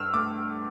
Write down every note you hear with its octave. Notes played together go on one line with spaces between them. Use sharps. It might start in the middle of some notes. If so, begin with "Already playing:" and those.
Already playing: G2 E6 F6
A3 D6